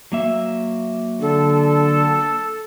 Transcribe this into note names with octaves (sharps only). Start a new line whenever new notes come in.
F#3 A#3 E5
D3 A4